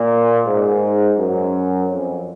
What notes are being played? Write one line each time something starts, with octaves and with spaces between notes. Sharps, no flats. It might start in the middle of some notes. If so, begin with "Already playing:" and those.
Already playing: A#2
G#2
F#2
F2